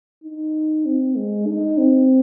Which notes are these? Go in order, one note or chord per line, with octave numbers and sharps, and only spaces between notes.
D#4
C4
G#3
D#4
C4